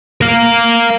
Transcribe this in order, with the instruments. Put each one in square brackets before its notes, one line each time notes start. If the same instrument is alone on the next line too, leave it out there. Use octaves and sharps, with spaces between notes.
[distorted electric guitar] A#4 F5